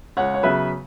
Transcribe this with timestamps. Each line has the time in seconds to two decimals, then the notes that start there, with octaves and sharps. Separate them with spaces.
0.17 C#2 C#5 F#5
0.34 C#5
0.43 C#3 F#3 B3 B4 E5